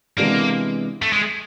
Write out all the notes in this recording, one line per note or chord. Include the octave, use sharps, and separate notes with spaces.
C3 E3 G#3 A#3 B3 D4
A3
G#3